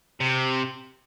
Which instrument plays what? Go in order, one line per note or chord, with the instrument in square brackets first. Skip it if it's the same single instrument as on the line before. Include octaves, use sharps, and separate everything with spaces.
[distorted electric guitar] C3